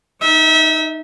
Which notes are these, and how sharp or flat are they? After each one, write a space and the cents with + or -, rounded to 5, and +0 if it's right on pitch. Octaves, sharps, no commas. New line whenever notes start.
D#4 +0 E5 -35